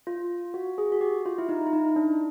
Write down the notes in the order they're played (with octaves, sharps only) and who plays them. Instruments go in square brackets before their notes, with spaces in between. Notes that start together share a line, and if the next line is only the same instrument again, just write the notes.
[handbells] F4
F#4
G#4
F#4
G4
F4
E4
D#4
E4
D#4
D4